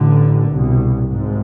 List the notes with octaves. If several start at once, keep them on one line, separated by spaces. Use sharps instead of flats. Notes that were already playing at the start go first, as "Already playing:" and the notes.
Already playing: A1 A2 D3
C2 B2
G#1 G#2